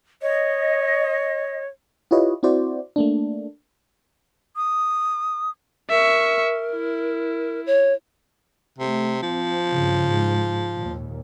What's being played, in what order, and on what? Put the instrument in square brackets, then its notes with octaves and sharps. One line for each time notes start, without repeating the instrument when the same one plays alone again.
[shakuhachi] C#5 [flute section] D#5
[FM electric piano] E4 F4 G4 B4 C#5 D#5
C4 E4 F#4 C5 D5
A3 A#3 D4
[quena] D#6
[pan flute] A#4 [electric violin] E5 C#6
[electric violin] E4
[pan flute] C#5
[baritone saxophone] C3 [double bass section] A3
[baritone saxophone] F3 [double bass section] C4
[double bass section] G2 C#3
G#2
D#2 A#2